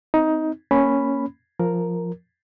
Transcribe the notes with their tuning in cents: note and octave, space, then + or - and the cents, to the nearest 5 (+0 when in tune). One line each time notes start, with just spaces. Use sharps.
C4 -20 D#4 +15
A#3 +0 C#4 +0 B5 +0
F3 +0 A#4 +0